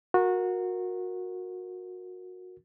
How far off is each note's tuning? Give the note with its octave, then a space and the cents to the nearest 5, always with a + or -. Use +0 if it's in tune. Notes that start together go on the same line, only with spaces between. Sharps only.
F#4 -25 A#4 +0